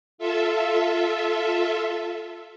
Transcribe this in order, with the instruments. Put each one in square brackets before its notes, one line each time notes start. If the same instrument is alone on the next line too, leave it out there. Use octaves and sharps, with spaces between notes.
[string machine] F4 A4 E5